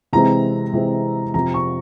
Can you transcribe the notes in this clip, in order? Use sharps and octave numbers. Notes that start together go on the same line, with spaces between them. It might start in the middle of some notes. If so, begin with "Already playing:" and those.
C3 E3 G#3 C4 A#5
C3 E3 G#3 C4
F2 C3 F3 C4 A#5
C#6